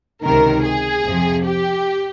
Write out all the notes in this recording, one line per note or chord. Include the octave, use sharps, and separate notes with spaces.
C#2 C3 D#3 A#4
G#4
F2 C3 F3
G4